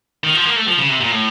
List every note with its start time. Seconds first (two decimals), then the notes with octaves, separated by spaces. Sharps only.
0.24 D#3
0.34 F3
0.45 A#3
0.56 A3
0.68 F3
0.78 C#3
0.89 C3
1.01 A#2
1.11 A2